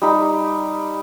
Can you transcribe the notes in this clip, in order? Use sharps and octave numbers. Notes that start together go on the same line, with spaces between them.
G3 D#4 B5